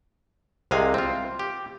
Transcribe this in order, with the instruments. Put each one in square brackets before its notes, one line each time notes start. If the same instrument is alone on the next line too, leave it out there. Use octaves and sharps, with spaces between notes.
[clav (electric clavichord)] C2 C3 G#3 F5 G#5
C4 F4
G4